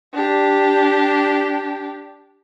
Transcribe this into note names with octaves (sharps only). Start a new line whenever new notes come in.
D4 G4